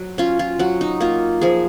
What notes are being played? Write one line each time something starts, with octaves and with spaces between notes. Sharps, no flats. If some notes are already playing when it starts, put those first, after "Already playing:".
Already playing: F#3
C#4 F4
F4
F#3 F#4
D#4
A#3 F4
F3 G#4